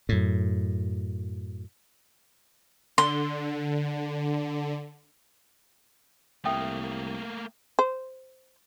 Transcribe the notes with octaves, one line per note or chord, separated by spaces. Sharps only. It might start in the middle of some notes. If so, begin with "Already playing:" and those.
F#2 A2
D3 C6
C2 A3 A#3 E5 G5 D#6
C5